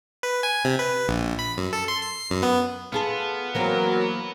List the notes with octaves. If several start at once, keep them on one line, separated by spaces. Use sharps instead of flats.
B4
G#5
C3
B4
A#1
B5
F#2
A4
C6
C7
F#2
B3
B3 F4 G#4 A4
E3 F#3 A#3 C4 A#4